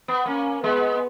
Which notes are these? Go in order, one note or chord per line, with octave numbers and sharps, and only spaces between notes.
B3
A#3 C#4
G#3 B3